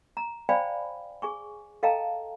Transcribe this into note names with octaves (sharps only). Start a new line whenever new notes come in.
A#5
C5 D5 F5 G5 G#5 B5
G#4 G#5 C#6
A4 D#5 F5 G5 A5 A#5